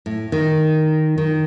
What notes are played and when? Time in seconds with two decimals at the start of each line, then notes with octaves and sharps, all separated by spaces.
0.06 A2
0.32 D#3
1.18 D#3